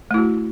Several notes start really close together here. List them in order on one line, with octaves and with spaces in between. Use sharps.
A3 E4 F#4